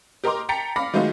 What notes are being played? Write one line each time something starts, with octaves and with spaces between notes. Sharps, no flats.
G4 A#4 D#5 A#5 C6 D6
G5 A5 A#5 A6 B6 C#7
F5 B5 D6 A#6
D#3 F#3 G#3 A3 D#4 F4